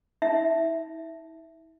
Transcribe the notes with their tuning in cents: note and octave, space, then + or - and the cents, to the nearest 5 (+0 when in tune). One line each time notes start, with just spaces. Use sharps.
E4 -40 E5 +0